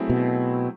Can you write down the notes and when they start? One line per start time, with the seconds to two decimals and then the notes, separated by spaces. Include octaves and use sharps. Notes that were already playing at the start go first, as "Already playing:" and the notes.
Already playing: F#3 A3 C4 E4 G#4
0.09 B2